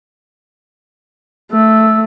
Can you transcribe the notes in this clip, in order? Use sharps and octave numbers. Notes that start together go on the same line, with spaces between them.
A3 E6